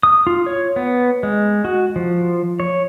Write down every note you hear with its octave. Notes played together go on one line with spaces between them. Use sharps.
D#6
F4
C#5
B3
G#3
F#4
F3
C#5